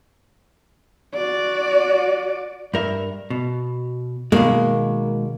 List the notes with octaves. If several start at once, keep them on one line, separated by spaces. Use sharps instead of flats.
F#4 D5
G2 A#4 E5
B2
B2 D#3 G#3 A#3